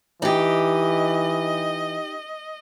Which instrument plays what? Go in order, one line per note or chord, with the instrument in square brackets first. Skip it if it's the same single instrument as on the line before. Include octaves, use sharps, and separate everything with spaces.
[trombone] E3 [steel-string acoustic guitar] D#4 G4 [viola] D#5